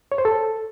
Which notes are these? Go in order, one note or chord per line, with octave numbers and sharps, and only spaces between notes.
C#5
C5
A4